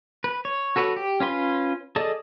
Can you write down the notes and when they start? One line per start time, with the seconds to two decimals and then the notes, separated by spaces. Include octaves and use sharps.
0.24 B4
0.45 C#5
0.76 F#4 A4 B4 C#5
0.96 G4
1.20 C#4 F4 B4 C6
1.96 G#4 A4 D5 D#5 A5